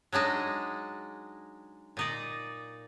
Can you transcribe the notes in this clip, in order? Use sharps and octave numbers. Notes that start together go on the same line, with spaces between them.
F#3 G#3 D4 D#4
A#2 D#4 D5